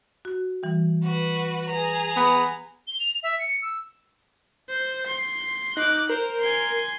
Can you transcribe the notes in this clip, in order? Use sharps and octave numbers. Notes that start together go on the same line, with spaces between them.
F#4
E3 G3
F#4 B4
G#4 B4 A#5
B3
G7
F7
E5
C#7
E6
C5
C6
D#4 D6 F#6
A#4 C5
G#5 C6